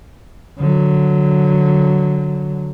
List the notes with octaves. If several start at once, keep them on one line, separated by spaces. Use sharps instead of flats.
D3 F#3